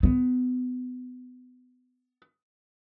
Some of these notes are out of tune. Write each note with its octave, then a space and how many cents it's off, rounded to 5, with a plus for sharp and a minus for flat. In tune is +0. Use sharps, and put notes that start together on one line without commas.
B3 +30